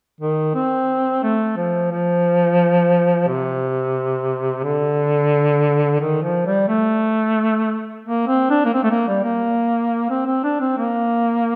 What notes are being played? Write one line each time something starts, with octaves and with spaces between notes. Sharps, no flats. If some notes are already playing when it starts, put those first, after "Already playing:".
D#3
C4
A3
F3
F3
C3
D3
D#3
F3
G3
A3
A#3
C4
D4
A#3
C4
A3
A#3
G3
A#3
C4
C4
D4
C4
A#3